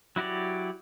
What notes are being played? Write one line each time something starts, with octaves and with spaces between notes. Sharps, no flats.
F#3 E4 F#4 G4 D5